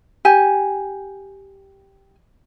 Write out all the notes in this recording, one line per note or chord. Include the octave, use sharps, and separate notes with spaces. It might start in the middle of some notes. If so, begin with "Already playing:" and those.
G4 G#5